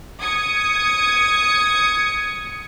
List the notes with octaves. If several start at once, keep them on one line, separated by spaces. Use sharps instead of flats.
D#6 G#6 C#7